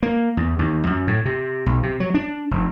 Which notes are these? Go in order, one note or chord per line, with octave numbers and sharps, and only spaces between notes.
A#3
E2
D#2
F#2
A2
C3
B1
C3
F#3
D4
F1